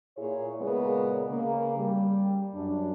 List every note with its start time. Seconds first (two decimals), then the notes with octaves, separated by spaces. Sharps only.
0.17 A#2 E4 G#4 C#5
0.61 A#2 C#3 G#3 B3 A#4
1.29 C#3 A#3
1.78 G3
2.54 F#2 D4